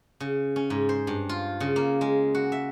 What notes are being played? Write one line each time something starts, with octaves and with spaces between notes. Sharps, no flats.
C#3
C#4
G#2
C5
G2
F4
C#3
A#3
G#3
F#4
E5